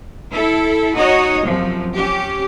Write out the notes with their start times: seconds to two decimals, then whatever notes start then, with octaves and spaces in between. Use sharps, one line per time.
0.33 E4 A4
0.97 D#4 F#4 C#5 D#5
1.45 F#2 C3 F3
1.95 C#4 G4